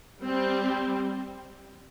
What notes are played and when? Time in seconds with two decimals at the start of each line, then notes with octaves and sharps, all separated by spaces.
0.21 G3 C4